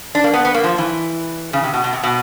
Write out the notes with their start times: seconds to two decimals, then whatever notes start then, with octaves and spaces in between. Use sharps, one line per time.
0.15 D4
0.24 A#3
0.34 B3
0.45 B3
0.54 A#3
0.64 F3
0.78 E3
1.53 C#3
1.64 C3
1.73 B2
1.84 B2
1.93 C3
2.04 B2